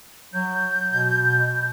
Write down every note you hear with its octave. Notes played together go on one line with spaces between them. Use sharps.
F#3 G6
B2